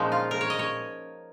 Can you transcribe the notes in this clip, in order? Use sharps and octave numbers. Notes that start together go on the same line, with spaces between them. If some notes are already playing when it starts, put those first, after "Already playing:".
Already playing: A#2 F3 G#3 C#4 D#4
F4
A#4
C#5
D#5
C#5